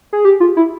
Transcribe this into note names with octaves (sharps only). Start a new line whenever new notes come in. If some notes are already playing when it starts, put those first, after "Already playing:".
G#4
G4
F4
E4